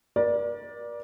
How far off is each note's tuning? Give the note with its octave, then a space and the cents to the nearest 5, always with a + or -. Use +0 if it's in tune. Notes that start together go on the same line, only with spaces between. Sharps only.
A#4 +40 D5 +0